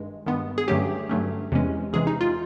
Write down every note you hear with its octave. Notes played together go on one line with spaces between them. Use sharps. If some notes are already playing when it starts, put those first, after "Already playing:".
Already playing: G2 D#3 G#3
G2 D#3 G#3 B3
G#4
G2 D3 F#3 A3 C#4 G4
G2 D3 F#3 A3 C#4
E2 C3 E3 G#3 C#4
E2 C3 E3 G#3 C#4 G#4
D#4
F4